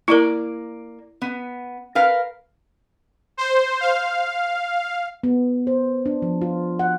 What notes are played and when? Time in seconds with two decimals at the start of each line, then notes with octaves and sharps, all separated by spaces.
0.08 A#3 E4 A#4 D5
1.22 B3
1.95 A#4 B4 F5
3.37 C5
3.80 F5
5.23 B3
5.67 C5
6.06 D4
6.22 F3
6.41 F4
6.79 F#5